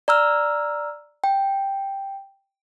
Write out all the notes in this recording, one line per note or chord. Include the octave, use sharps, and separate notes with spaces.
D5 A#5 E6 F6
G5